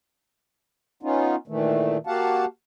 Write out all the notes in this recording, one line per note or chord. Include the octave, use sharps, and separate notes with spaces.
B3 C#4 D#4 F4
A#2 D#3 E3 A3
A#3 F#4 G4 F5 F#5 A5